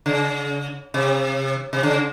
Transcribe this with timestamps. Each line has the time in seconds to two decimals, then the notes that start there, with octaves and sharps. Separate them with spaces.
0.06 C#3
0.94 C3
1.73 C3
1.83 C#3